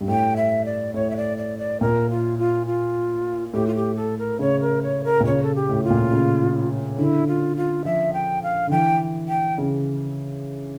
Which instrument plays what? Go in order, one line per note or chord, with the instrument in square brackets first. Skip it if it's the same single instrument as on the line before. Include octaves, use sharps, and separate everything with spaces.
[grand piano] G2
[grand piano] A2 [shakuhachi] G5
[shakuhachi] E5
D5
[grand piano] A2 [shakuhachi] C#5
[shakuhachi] E5
D5
D5
D5
[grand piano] A#2 [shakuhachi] A#4
[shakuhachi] F4
F4
F4
[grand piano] A2 [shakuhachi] G4
[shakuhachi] F4
G4
A4
A#4
[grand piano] C#3 [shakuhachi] C#5
[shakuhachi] A#4
C#5
A#4
[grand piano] A#2
[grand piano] C#3 [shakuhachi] C#5
[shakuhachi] A4
G4
[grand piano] A2
[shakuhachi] F4
[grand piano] A#2
C#3
[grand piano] D3 [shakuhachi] E4
[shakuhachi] F4
F4
[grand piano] F3 [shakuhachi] E5
[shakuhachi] G5
F5
[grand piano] D3
[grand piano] E3 [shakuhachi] G5
[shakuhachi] G5
[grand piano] C#3